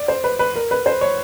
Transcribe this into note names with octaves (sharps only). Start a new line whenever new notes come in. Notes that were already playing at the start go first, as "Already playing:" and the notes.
Already playing: D5
C5
B4
B4
A#4
B4
C5
C#5